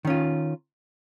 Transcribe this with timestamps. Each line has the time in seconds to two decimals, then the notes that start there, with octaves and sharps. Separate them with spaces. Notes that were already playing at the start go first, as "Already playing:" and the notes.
0.05 D#3
0.07 C#4
0.10 F4